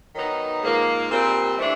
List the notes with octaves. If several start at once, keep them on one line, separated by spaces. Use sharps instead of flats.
D#3 F#3 B3 D#4
G#2 F3 A#3
A#2 G3 C4
C3 E3 A3 D4